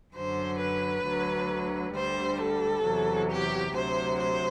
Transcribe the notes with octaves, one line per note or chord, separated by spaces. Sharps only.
F#2 D3 F#3 C5
B4
D2 D3 F#3
D2 D3 G3 C5
A4
E2 C3 F#3
G4
D2 C3 F#3 C5
C5